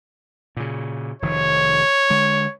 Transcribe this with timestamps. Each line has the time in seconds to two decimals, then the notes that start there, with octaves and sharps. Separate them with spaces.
0.57 A#2 C#3
1.22 F1 D#3 F3 C#5
2.10 D3 G#3